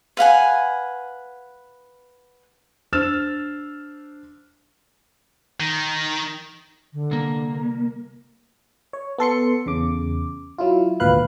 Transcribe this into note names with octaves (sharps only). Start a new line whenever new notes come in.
B4 F5 F#5 G#5
D4 C5 E6 F6 A6 E7
D#3
D3
C2 A#3
C#5
B3 A4 C6 C#7
E2 C#3 D6
F#3 E4 F4
G#1 D2 A#2 B4 F5 F#6